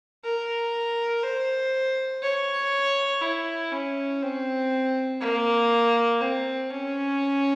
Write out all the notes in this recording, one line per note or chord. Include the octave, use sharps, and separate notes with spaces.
A#4
C5
C#5
E4
C#4
C4
A#3
C4
C#4